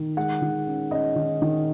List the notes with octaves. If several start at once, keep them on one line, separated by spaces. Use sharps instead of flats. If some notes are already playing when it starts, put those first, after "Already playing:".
Already playing: D#3
G#3 F#5
D#3
C#4
C#4 D#5
D#3
D#3